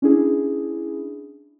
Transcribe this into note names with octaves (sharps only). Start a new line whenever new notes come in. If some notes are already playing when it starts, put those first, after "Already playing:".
C#4 D4 E4 G#4